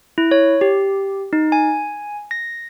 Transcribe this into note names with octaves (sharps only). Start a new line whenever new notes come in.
E4
C#5
G4
D#4
G#5
A#6